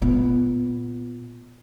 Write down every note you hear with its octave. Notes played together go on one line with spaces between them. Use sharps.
A#2 B3